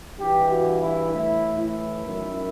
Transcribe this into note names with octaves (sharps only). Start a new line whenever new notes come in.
G2 E3 G4
F#4
E4
A2 E3 E4
E4
F#2 D#3